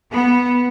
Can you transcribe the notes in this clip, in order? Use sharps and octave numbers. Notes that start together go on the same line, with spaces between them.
B3